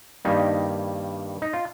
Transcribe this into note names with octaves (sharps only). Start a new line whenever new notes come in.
G2 D#3 G3 A#3 D#4
D#4
F4